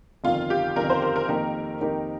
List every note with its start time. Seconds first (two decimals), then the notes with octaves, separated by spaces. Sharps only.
0.24 G1 F2 D#3 F4
0.50 G4
0.76 G1 F2 D#3 A#4
0.90 C5
1.02 A#4
1.16 A#4
1.28 F2 D#3 A#3 D#4 G4 A#4
1.81 F2 D#3 A#3 D#4 G4